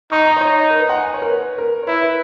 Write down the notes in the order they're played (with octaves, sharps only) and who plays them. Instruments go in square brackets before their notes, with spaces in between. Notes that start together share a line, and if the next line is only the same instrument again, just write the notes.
[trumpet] D#4 [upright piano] C#6
[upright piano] A#5
D#5
[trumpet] D#4 [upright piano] C#5
[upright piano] A#4
B4
F#5
G#5
C#5
A#4
B4
A#4
C#5
[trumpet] E4 [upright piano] B4
[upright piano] B4